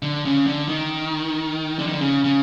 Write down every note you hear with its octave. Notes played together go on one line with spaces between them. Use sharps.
D3
C#3
D3
D#3
D3
D#3
D3
C#3
C#3